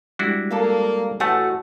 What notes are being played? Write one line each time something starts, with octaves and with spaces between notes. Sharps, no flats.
G3 G#3 D4 E4 F#4 G4
A#3 A4 D5 F5
A1 A3 F#4 F#5 G#5 A5